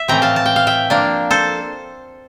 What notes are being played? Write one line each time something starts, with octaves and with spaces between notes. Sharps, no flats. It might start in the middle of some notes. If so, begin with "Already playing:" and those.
Already playing: E5
A2 E3 A3 C4 G5 A#5
F5 A5
A5
G5
F5
E5 G5
F3 A#3 D4
A4 C5